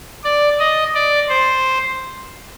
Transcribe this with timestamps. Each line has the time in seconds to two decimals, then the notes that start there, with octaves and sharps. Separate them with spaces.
0.24 D5
0.59 D#5
0.94 D5
1.29 C5